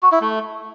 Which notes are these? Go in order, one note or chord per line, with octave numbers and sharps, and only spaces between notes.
F#4
E4
A3